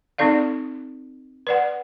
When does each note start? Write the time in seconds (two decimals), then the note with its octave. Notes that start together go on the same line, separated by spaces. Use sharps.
0.18 C4 D#4 A4 D5 F5
1.47 B4 D5 F#5